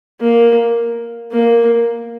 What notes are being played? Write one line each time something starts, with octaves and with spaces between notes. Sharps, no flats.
A#3
A#3